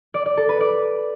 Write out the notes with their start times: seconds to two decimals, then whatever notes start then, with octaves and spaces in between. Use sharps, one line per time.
0.14 D5
0.26 D5
0.37 A4
0.49 B4
0.60 D5